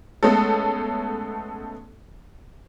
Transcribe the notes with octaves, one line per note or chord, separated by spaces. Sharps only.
G#3 A3 B3 C#4 A4